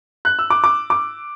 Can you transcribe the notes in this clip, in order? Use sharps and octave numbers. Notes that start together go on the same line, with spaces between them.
F#6
E6
D6
D6
D6